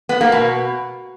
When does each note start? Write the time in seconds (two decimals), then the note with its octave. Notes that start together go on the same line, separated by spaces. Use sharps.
0.09 B3
0.21 A#3
0.32 B2